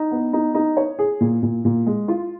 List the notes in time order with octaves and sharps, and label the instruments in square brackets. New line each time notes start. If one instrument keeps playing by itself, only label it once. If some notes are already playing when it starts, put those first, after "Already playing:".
Already playing: [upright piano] D#4
B3
D#4
D#4
C#5
G#4
A#2
A#2
A#2
G#3
F4